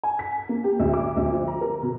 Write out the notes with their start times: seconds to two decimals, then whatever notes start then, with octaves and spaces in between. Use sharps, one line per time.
0.03 G#5
0.19 B6
0.49 A#3
0.64 G4
0.80 D2
0.94 D6
1.17 D2
1.31 F3
1.47 A#5
1.61 A#4
1.83 B2